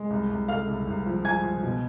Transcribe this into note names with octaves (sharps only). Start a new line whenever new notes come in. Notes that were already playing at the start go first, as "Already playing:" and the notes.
Already playing: G#3
C2
C2
A3 F5 F6
C2
C2
F3
F3 G#5 G#6
F3
B2